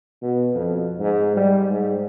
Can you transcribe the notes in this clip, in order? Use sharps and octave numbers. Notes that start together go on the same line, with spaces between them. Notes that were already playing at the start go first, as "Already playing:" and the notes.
B2
F2
G#2
G3
G#2